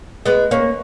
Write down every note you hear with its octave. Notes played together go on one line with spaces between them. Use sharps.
G#3 B3
A#3 C#4